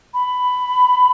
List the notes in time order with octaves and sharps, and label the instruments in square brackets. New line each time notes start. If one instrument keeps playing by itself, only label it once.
[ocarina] B5